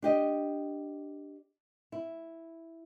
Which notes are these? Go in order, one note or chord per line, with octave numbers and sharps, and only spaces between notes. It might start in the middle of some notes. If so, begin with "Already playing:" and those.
D4 G4 D#5
E4